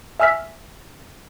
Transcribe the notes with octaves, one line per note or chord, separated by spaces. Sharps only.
E5 G#5 E6 F6 B6